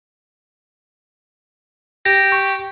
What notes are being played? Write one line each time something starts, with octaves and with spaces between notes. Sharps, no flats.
G4 A#6
C#6